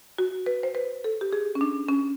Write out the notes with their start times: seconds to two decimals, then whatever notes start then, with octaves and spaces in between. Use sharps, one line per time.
0.18 F#4
0.46 B4
0.63 C5
0.75 B4
1.04 A4
1.21 G4
1.33 G#4
1.55 C#4
1.61 D4
1.89 C#4